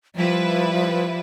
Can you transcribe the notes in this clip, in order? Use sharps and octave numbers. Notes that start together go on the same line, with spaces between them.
F3 G3 E4 B4